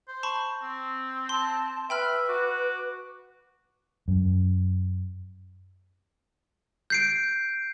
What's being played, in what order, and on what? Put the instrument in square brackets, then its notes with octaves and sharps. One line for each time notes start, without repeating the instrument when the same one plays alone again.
[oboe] C5
[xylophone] A5 B5 C#6
[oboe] C4
[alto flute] A5 [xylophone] C6
[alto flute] B4 [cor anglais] E5 [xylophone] G5 B5 F6
[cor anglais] F#4 [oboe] D6
[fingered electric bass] F#2
[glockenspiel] G6 C7 D7